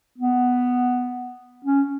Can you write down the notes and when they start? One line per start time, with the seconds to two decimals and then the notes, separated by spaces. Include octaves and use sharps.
0.18 B3
1.65 C#4